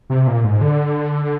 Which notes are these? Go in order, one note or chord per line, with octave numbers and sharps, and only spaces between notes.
C3
A#2
G#2
D3